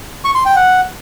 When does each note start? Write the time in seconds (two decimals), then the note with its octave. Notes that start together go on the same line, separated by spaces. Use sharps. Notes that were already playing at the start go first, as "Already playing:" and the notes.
0.25 C#6
0.35 C6
0.46 G5
0.56 F#5